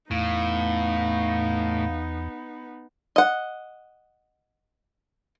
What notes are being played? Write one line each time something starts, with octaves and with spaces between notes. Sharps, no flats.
E2 A2 B3 D#4 F5
D#5 F#5